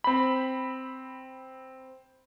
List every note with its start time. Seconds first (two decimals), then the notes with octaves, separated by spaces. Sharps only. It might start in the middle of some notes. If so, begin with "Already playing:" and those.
0.04 C4 B5